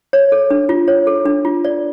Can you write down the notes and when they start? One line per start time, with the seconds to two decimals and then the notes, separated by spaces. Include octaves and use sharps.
0.13 C#5
0.32 A4
0.50 D4
0.69 F4
0.88 C#5
1.07 A4
1.26 D4
1.45 F4
1.65 D5